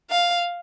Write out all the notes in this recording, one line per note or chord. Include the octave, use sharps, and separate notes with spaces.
F5